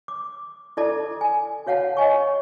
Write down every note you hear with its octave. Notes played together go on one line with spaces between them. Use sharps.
D6
E4 A4 D5 A5 D6
G#5
F#4 C#5 F5 F#5 A5
C#5 D#5 G#5 C#6